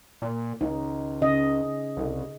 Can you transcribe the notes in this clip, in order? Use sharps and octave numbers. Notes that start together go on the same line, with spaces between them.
A#2
C#2 D#4
C#3 D#5
C2